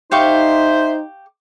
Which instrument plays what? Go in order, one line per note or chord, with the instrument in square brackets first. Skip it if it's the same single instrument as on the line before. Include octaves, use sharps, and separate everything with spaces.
[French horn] D#4 [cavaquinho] G4 F5 C#6 [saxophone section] C5 [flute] E5